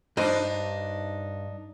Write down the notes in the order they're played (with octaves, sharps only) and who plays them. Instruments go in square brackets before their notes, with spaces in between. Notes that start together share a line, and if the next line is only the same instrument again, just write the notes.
[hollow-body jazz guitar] G2 C5 D#5 [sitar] D4 D#4